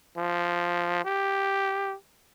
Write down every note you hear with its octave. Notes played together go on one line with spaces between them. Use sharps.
F3
G4